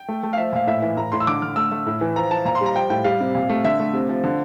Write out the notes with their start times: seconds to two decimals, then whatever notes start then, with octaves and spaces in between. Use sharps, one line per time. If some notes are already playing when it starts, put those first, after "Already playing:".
Already playing: G5
0.08 A3
0.23 A3
0.33 F5
0.37 F3 E5
0.53 A#2 F5
0.67 A2 E5
0.82 E3 E5
0.97 A2 A#5
1.12 A2 C6
1.20 E6
1.27 D3 D6
1.42 D3 F6
1.56 A3 E6
1.71 A3
1.86 A2
2.01 E3
2.16 F3 A#5
2.30 F3 A5
2.45 A#2 A#5
2.55 C6
2.61 G3 A#5
2.75 F3 G5
2.90 A2 G5
3.04 G3 F5
3.20 C3
3.35 A#2
3.50 A3
3.64 D3 E5
3.79 A3
3.94 C3
4.09 F3
4.24 D3